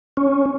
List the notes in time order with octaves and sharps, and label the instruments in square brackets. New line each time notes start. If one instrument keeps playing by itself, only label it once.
[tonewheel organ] C#4